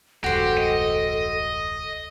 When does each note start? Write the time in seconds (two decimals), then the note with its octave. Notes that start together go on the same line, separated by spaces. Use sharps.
0.24 E1 C#2 G2 F#4 G4 A4 C5
0.58 D#5